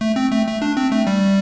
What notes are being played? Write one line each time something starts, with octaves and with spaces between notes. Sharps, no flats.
A3
C4
A3
A3
D4
C4
A3
G3